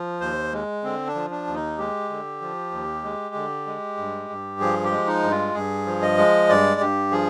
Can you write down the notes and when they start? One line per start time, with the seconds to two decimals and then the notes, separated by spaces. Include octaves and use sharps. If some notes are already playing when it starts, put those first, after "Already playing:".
Already playing: F3
0.20 D#2 C5
0.53 G#3
0.84 D3 C4
1.07 D4
1.15 F3
1.30 D4
1.47 D#2
1.55 D#4
1.78 G#3 G4
2.10 D3
2.41 F3
2.72 D#2
3.04 G#3
3.35 D3
3.67 G#3
3.98 G2
4.30 G2
4.60 F3 G#4
4.84 G4
4.91 G#3
5.07 D#4
5.23 G2
5.31 F4
5.54 G2 G#4
5.86 F3
6.02 D#5
6.17 G#3
6.49 G2 D5
6.81 G2 G4
7.11 F3 G#4